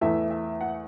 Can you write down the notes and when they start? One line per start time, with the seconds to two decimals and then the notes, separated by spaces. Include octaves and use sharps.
0.01 E2 E3 A3 E4 E5
0.30 E5
0.61 F#5